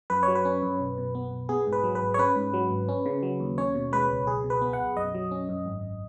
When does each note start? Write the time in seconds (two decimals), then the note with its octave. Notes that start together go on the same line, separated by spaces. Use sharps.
0.10 F#2 B4
0.23 F#3 C#5
0.35 B4
0.45 C#4
0.62 F#2
0.80 B1
0.98 B2
1.15 B3
1.32 B1
1.49 B3 G#4
1.67 G#2
1.73 B4
1.84 F#3
1.95 B4
2.02 G#1
2.14 C#5
2.19 C#4 B4
2.36 G#2
2.53 F#3
2.71 G#1
2.88 C#4
3.06 C#3
3.23 F#3
3.40 D#2
3.58 C#4 C#5
3.75 B2
3.92 G#3 B4
4.09 C#2
4.27 B1 G#4
4.44 B2
4.50 B4
4.62 B3
4.73 F#5
4.79 B1
4.97 F#2 D#5
5.14 F#3
5.31 C#4
5.49 F#2
5.66 G#1